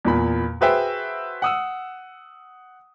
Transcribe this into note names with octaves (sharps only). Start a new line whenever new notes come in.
E2 A#2 B5
F#4 G#4 B4 C5 E5 G5
F#5 D#6 E6